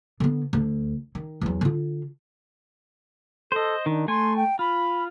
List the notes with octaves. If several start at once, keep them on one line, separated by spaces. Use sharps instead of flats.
D3 B3
D2
D#3
E2 F#3
D3 F4
A4 C5 D#5
D#3 D4
A3 G#5 C6
G5
F4 B5